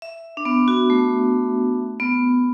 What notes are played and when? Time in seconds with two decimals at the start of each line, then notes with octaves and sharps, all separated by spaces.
0.02 E5
0.37 D4
0.45 B3
0.68 F#4
0.90 A3
2.00 B3